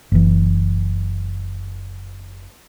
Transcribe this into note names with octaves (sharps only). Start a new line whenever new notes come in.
F#1 E3